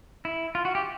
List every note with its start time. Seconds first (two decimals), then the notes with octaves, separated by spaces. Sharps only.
0.25 E4
0.55 F4
0.65 F#4
0.75 G4